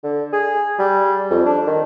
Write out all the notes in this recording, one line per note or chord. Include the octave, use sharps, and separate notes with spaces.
D3
G#4
G3
F2
D4
D#3